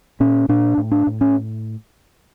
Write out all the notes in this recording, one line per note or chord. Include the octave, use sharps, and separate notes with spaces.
A#2 C#4
A#2 D4
A2
D4
A2
C#4